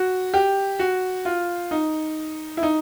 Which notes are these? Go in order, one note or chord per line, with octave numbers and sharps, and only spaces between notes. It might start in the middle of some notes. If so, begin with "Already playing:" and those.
Already playing: F#4
G4
F#4
F4
D#4
E4
D#4